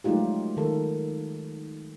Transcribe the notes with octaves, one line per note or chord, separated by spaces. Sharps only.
F#3 G#3 A3 D#4 F4 G4
D#3 A4 A#4